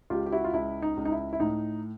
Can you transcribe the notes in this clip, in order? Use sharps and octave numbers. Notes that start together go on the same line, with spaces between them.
C#2 F4 G4
G4
E4 F#4
F4
C#2 E4
D#4
C#2
D#4
E4
E4
A2 D#4